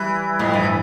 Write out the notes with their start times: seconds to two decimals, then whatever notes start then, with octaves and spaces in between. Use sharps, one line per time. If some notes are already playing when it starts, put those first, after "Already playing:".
Already playing: E3 G3
0.39 F2 A2
0.53 G2 E3